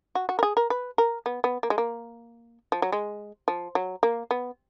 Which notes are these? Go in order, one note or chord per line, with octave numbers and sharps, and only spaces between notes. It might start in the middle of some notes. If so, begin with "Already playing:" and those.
F#4
F#4
A#4
G#4
A#4
B4
A#4
B3
B3
A#3
G#3
A#3
F3
F#3
G#3
F3
F#3
A#3
B3